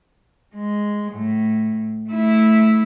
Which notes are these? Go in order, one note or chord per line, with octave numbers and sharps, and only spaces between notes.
G#3
A2
A3 E4